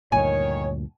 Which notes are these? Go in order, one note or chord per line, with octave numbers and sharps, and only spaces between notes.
D2 G2 A#2 D#3 C#5 G#5